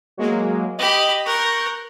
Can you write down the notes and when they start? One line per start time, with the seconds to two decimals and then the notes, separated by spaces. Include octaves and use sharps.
0.17 F#3 G#3 A#3
0.78 G4 D#5 B5
1.25 A#4 C#6 F#6 G6